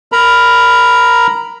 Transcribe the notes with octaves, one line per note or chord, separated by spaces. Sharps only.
A#4 A#5 B5